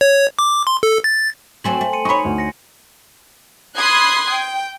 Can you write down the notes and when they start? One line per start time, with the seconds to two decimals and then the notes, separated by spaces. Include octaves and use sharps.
0.01 C#5
0.39 D6
0.67 C6
0.83 A4
1.04 A6
1.64 F#3 A3 C4 G#5 C6 F#7
1.81 A3
1.93 C6 C#7 D#7
2.05 D#4 C#5 B5 C#6
2.25 D2
2.38 A#6 C#7
3.75 B5 C6 D#6 F#6 G#6 C7
4.31 G5